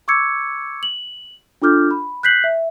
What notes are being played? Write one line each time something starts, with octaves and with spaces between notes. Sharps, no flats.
C#6 D6 E6 G#6 C#7
F#7
D4 F4 A4 D6 F6 G6
B5
F#6 G6 B6 C7 F#7
E5